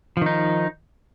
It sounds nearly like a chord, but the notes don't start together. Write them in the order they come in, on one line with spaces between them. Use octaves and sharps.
F3 D#3 D#4